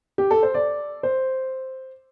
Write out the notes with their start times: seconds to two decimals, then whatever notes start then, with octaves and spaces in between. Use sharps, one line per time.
0.18 G4
0.31 A4
0.43 C5
0.54 D5
1.03 C5